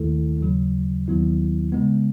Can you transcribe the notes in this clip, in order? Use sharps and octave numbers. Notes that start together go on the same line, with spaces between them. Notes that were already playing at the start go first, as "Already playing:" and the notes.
Already playing: D#2 D#3 A3 E4 A4
D#2 C#3 F#3
D#2 D#3 F#3 B3 E4
C#3 G#3 B3